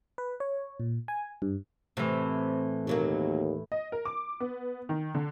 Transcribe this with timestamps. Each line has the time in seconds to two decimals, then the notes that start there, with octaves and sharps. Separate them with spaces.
0.18 B4
0.40 C#5
0.80 A#2
1.08 G#5
1.42 G2
1.97 A2 C3 E3
2.87 D#2 B2 F#3 A#3
3.72 D#5
3.92 A#4
4.05 D6
4.40 B3
4.89 D#3
5.15 D3